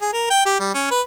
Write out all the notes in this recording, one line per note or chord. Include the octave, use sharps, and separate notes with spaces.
G#4
A#4
G5
G4
G3
C#4
B4